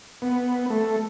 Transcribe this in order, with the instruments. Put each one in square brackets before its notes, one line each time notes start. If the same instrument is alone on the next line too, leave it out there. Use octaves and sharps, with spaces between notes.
[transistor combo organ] B3
A3